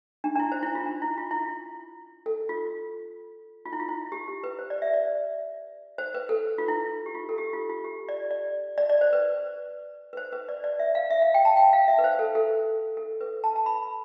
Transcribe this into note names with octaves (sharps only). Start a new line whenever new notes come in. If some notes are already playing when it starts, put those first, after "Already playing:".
D4
D4
E4
C5
E4
F4
D4
E4
F4
E4
F4
A4
F4
F4
E4
F4
E4
G4
G4
B4
C5
D5
E5
D5
C5
B4
A4
F4
E4
G4
F4
A4
G4
F4
F4
G4
D5
D5
D5
D5
C5
B4
B4
C5
B4
D5
D5
E5
F5
E5
F5
G5
A5
G5
F5
E5
B4
C5
A4
A4
A4
B4
A5
A5
B5